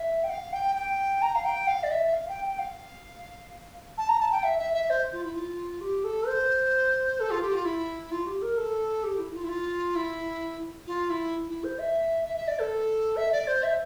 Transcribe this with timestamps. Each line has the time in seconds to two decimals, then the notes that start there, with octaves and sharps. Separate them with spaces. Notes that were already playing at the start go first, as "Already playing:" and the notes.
Already playing: E5
0.24 G5
0.30 F5
0.53 G5
0.75 G5
1.22 A#5
1.35 F5
1.45 G5
1.67 F5
1.83 D5
1.91 E5
2.13 F5
2.29 G5
2.44 G5
2.59 F5
3.98 A5
4.09 A#5
4.20 A5
4.32 G5
4.44 E5
4.59 E5
4.74 E5
4.90 C5
5.12 F4
5.24 E4
5.35 F4
5.81 G4
6.04 A4
6.27 C5
7.20 A4
7.31 F4
7.42 G4
7.53 F4
7.65 E4
8.11 F4
8.26 G4
8.42 A#4
8.57 A4
9.04 G4
9.18 E4
9.34 F4
9.43 E4
9.49 F4
9.95 E4
10.87 F4
11.10 E4
11.49 E4
11.64 C5
11.79 E5
12.25 E5
12.37 E5
12.48 D5
12.59 A4
13.17 E5
13.32 D5
13.48 C5
13.63 E5